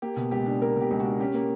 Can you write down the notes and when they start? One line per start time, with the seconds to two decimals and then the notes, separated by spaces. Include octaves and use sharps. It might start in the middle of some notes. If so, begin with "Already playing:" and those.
0.02 A#3 G4
0.17 B2
0.31 C#2 G4
0.46 D4
0.62 A#3 A#4
0.76 B2
0.81 G4
0.91 C#2
1.00 F#4
1.05 D4
1.20 C#4 G4
1.34 A#3